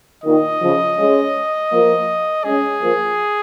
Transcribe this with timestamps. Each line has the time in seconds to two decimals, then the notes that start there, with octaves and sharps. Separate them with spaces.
0.24 A#2 D#3 D#5
0.61 C#3 F3
0.98 G#3 C#4
1.71 F3 A#3
2.44 G#3 C#4 G#4
2.81 F3 A#3